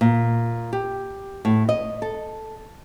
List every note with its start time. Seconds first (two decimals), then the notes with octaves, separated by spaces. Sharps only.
0.01 A#2
0.73 G4
1.45 A2
1.69 D#5
2.02 A4